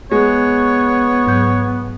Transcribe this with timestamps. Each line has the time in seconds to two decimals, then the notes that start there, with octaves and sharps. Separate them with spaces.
0.11 G#3 B3 C#5
1.27 G#2 F#3 G6